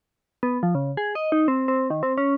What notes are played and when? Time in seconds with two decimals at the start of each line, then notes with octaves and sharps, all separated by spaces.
0.43 B3
0.63 F3
0.75 C#3
0.97 G#4
1.15 D#5
1.32 D#4
1.48 C4
1.68 C4
1.90 D#3
2.03 C4
2.18 C#4